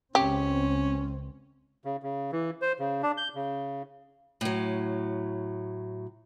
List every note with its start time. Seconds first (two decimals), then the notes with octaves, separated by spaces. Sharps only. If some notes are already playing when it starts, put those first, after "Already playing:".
0.15 C#2 C4 C#4 G4
1.85 C#3
2.03 C#3
2.32 E3
2.62 C5
2.79 C#3
3.03 D4
3.17 G6
3.35 C#3
4.41 A2 F#3